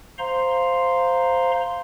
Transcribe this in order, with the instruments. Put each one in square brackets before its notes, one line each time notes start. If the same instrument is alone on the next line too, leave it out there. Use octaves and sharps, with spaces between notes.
[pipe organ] C5 F5 A#5 C6